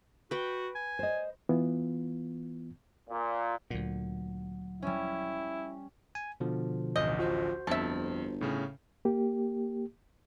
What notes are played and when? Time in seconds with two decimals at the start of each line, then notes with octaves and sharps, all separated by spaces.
0.31 F#4 B4 G5
0.75 G#5
0.99 C5 D#5
1.49 E3 B3 F4
3.10 A#2
3.70 D2 A#2 F#3
4.82 G3 C#4 E4
6.15 G#5
6.40 B2 D3 F3
6.96 A1 D2 D#5 G6
7.19 F3 F#4 C5
7.67 G1 F2 E5 A5
8.41 A2 C#3 C#4
9.05 A#3 G4